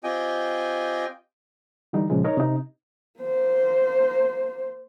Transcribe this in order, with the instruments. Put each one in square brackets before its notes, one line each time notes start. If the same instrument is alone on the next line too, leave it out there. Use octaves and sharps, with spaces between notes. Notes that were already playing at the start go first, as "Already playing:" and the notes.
[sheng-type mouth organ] C4 F4 G4 D#5 G5 G#5
[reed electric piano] D3 E3 G3 D#4
A#2 C#3 F3 G#3
D#4 A#4 C#5 D#5
C3 D#4
[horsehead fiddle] A#3 C5